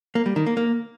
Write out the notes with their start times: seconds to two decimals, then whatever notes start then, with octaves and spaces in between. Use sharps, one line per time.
0.15 A#3
0.26 G3
0.36 D#3
0.46 A#3
0.57 A#3